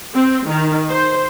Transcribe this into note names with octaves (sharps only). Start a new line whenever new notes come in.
C4
D#3
C5